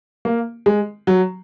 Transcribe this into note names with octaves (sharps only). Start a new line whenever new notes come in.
A#3
G#3
F#3